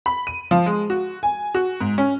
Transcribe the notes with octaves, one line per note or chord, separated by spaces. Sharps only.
B5
D#7
F3
G#3
F#4
G#5
F#4
G#2
C#4